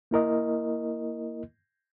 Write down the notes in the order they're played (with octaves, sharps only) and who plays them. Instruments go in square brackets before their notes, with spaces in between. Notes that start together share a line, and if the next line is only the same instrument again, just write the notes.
[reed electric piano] A#3 E4 A#4 D#5